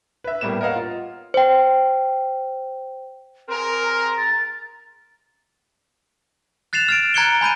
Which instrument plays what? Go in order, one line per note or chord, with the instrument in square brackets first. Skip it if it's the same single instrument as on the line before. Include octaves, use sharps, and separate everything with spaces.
[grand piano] B4 E5
A2 G3 A#3 B3 E7
A#4 C#5 D#5 F5 F#5
F4
[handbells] C5 G5
[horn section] C4 G#4 A#4 [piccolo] C6
[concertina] A#5
[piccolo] A6
[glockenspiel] F#6 A6 C7 E7 F7
F6 A6 D7
A#5 F#6 G#6 C#7 D7 G7
G#5 B5 G6 D#7